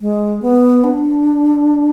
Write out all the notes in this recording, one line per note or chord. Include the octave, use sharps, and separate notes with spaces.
G#3
B3
D4